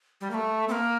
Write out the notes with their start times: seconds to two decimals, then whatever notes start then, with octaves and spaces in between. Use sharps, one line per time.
0.21 G3
0.30 A#3
0.34 A3
0.68 C4
0.71 A#3